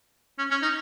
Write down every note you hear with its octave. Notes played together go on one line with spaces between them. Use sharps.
C#4
C#4
D#4